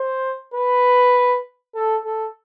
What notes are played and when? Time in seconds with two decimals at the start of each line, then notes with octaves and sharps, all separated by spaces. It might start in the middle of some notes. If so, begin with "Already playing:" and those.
Already playing: C5
0.54 B4
1.75 A4
2.05 A4